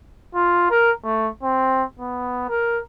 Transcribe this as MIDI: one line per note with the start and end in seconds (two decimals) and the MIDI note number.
0.35 0.66 65
0.70 0.91 70
1.04 1.29 57
1.43 1.83 60
1.99 2.44 59
2.49 2.80 70